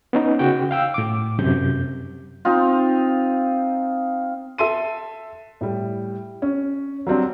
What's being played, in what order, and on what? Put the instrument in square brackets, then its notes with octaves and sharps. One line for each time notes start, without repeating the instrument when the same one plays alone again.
[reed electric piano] B3 C#4 D#4
C#3 F#4 G5
F5 G5 E6
A2 D6
F#2 C3 G6
[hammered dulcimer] C4 D#4 F4
[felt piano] A4 E5 C6 D#7
A2 G3
C#4
F#3 G3 C4 D4